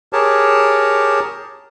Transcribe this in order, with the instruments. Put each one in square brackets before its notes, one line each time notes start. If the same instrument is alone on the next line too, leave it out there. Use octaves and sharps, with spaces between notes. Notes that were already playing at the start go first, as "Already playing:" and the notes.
[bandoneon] G4 G#4 A#4 C#5 A5